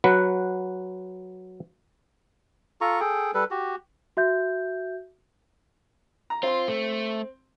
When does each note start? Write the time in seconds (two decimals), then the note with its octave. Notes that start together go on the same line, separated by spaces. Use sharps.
0.04 F#3 B4 F#5
2.81 F4 A4 A#5 C#6
3.00 G#4 A4 G5
3.34 G3 A4 B4
3.51 F#4 G4
4.17 F#4 E5 G6
6.30 A#5
6.43 C4 F4 C6
6.68 A3